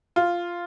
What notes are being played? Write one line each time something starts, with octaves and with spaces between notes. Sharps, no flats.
F4